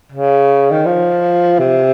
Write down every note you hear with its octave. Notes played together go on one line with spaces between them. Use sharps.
C#3
D#3
F3
C3